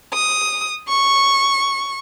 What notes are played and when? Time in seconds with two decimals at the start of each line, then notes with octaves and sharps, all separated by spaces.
0.13 D#6
0.88 C#6